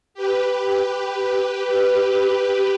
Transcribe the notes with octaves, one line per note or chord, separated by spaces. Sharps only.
G4 B4